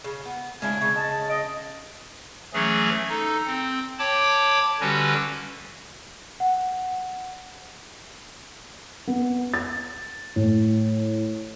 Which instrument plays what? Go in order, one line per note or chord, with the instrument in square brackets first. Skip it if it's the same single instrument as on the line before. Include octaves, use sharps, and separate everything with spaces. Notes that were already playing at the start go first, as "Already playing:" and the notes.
[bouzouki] C#3
B3
[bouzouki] C#3 D4 E4 [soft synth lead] G#3 [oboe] G#5
[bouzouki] C#3 [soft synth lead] C#6
[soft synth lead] D#5 [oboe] A5
[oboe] D#5 [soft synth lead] D7
[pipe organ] E3 F#3 A3 C#4 G#4
D#4 A4
C4
C#5 G5 A5 B5 D6
D3 G3 C#4 F#4 G4 B4
[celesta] F#5
[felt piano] B3
A6
A2